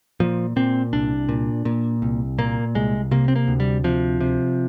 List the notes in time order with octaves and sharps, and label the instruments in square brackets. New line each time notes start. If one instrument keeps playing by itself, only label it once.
[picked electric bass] A#2 F3
A#2 C4
C2 D4
A#2
A#2
C2
A#2 A#3
C2 G#3
C3 A#3
C4
A#3
D2
G3
C3 F3
C3